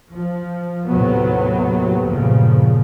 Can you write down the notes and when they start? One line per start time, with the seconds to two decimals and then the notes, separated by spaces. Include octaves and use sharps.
0.12 F3
0.87 D#2 A2 C3 F#3 B3
2.08 G2 A#2 C#3 F3